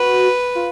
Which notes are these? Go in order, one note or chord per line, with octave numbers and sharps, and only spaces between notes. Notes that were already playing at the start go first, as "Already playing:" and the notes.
Already playing: F#4 B4
F4